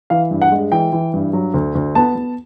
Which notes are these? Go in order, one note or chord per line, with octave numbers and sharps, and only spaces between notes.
E3 F5
G2
F#5
G#3
E3 G5
E3
G2
F#3
D2
D2
B3 A5
B3